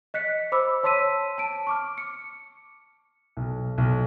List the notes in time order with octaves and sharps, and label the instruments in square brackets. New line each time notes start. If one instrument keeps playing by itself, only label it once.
[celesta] D#5 F#6 B6 C#7
C5 B5 D6 E6
C#5 A5 C6 E6 B6 D#7
A5 D7
C#6 D6 F6
C#7
[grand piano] B1
B1